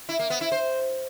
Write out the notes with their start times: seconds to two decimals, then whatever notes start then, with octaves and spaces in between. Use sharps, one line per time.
0.09 E4
0.19 A#3
0.30 B3
0.41 E4
0.52 C5